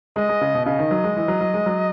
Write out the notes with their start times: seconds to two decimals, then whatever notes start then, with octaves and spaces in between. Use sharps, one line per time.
0.16 G#3 D#5
0.29 G#3
0.41 C#3
0.54 B2
0.66 C#3 D#5
0.79 D#3
0.91 F#3
1.04 G#3
1.16 E3
1.28 F#3
1.41 F#3
1.54 G#3
1.66 F#3